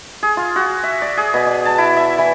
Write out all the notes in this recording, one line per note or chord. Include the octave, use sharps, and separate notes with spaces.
G#4
F4
F#4
E5
D5
G#4
B2
D5
A5
E4
E5
E3